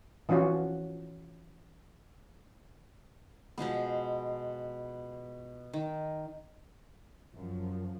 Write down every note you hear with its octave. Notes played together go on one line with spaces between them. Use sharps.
E3 F3 C#4 F4 F#4
B2 F3 G#3 B3
D#3
F#2 F3